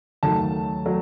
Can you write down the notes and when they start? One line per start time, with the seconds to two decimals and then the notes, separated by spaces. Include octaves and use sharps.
0.23 D#2 D#3 F#3 A3 A5
0.85 F#3 A3